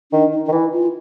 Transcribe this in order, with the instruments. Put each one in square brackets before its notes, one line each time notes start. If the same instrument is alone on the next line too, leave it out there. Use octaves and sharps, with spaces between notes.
[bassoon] D#3 [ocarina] D4
[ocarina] D#4
D#4
[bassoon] D#3
[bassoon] E3 [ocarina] E4
[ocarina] F4